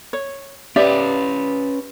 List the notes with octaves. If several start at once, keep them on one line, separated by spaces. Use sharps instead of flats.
C#5
C#4 G4 B4 D5 E5